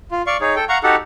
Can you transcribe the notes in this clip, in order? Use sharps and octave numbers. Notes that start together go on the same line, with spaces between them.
F4
D5 F5 C#6
D#4 G#4 C#5
A4 G5
F5 F#5 A#5 C#6
D#4 F#4 G4 A4 F#5